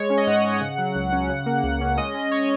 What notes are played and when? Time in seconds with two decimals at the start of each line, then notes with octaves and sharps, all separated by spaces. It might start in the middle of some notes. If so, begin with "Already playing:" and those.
Already playing: G#3 C#5
0.10 C#4
0.18 D#5
0.27 G#2 F#5
0.44 G#2
0.61 C#3
0.78 F#3
0.95 C#2
1.13 C#4
1.29 C#3
1.46 A#3
1.63 C#2
1.81 C#4
1.98 G#3 D#5
2.14 C#4
2.32 C#5